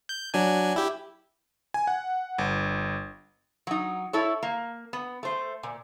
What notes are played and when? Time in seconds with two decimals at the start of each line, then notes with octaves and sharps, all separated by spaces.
0.09 G6
0.34 F#3 D4 G#5
0.76 E4 G4
1.74 G#5
1.87 F#5
2.39 G1
3.67 F#3 D#4
4.13 E4 A4 C#5
4.43 A#3
4.93 B3
5.23 A3 C5
5.63 A#2